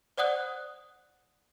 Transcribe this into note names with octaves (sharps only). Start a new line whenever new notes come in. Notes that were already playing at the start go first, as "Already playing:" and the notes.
C5 D5 F#5 D#6 F#6